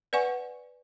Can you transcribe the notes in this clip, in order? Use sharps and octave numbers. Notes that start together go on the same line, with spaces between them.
B4 D5 F#5 G#5 C#6